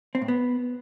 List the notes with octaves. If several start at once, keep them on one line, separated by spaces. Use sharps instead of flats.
C4
A2
B3